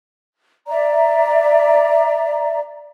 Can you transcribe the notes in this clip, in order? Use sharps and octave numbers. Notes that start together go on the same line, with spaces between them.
D5 E5 A#5